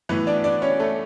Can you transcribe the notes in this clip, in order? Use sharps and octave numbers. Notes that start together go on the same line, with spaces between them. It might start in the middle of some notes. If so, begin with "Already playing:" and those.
A2 E3 B3 B4
D4 D5
D4 D5
C#4 C#5
A3 A4